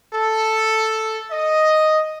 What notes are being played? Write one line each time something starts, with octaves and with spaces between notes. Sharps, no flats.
A4
D#5